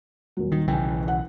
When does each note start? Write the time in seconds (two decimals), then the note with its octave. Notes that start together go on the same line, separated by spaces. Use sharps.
0.37 D#1 F#3
0.52 D#3
0.68 B1 C#3 E3 G5 G#5
1.08 F#5